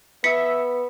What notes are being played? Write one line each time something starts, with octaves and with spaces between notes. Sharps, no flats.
B3 E5 B6 C#7